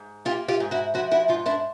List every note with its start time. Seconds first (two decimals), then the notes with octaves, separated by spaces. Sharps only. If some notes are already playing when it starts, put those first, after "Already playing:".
Already playing: G#2
0.25 A#3 F4 G4
0.48 F4 G4
0.60 G#2
0.71 E4 F#4
0.94 F3 E4 F#4
1.11 E4 F#4
1.28 G#2 D#4 F4
1.46 D4 E4